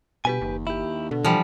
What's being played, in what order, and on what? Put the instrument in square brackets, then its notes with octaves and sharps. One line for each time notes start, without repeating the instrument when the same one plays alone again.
[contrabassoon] G1 [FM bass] B2 [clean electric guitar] G4 B4 G#5
[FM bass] F#1 [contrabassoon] D#2
[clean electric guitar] E4 G4
[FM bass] B2 [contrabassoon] D3
[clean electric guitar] E3 [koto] F3 G3